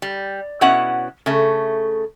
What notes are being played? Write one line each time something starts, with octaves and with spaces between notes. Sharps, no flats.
G3
B2 C#4 E4 F#5
C#3 A3